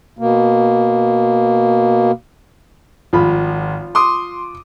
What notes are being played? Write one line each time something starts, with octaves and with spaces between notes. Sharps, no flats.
B2 A#3
G#1 F3 F4 B5
C6 D6 D#6